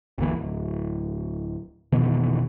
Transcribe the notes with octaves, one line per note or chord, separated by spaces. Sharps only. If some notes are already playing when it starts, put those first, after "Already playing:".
G1 D#2 E3
D1
F1 B2 D#3 E3